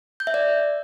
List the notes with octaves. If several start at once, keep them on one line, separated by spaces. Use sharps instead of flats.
G6
E5
D5